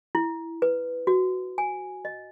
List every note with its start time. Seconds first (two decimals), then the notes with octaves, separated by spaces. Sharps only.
0.15 E4
0.62 B4
1.07 F#4
1.58 G#5
2.05 D#5